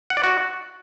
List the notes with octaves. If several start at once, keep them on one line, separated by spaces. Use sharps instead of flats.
F#5
D5
F#4